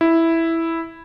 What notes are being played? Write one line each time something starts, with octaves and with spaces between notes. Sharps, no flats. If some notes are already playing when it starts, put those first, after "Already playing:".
E4